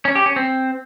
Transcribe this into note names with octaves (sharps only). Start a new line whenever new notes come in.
C#4
G4
C#4
C4